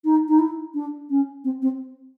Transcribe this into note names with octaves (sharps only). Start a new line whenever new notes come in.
D#4
D#4
E4
D4
C#4
C4
C4